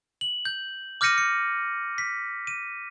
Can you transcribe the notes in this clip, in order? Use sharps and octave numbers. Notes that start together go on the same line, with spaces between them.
F#7
G6
D6 F6 G6 A#6 C#7 D#7
C#7
B6
D#7